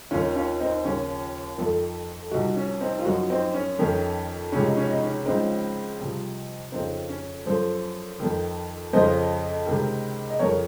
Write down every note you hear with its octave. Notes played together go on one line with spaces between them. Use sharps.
D#2 D#3 C#4 F4
C#4 F4
C4 D#4
D#2 C#3 F3 C#4 F4
F2 D#3 F4 A4
C2 C3 F3 D#4 F#4
C#4
C4 D#4
F4
F#2 F3 D#4 F#4
C4 D#4
C#4
F2 D#3 C#4
C#2 C3 F3 C#4
D#4
C#4
D#4
C#4
C#2 C#3 F3 C4 D#4
C2 C3 F3
F2 C#3 F3 C4 D#4
C#4
F#2 F3 A4 C5
F2 D#3
F2 C#3 F3 C5 D#5
C#2 C3 D#3
D#5
F2 C#3 F3 A#4 C#5